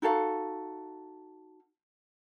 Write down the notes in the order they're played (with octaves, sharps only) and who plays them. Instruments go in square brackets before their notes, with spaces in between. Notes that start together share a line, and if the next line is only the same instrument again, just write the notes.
[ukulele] D#4 F#4 A4 F5